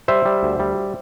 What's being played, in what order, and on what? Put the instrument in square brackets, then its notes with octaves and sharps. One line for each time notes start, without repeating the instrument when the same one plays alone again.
[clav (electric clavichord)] G3 C5 E5
G3
D2
G3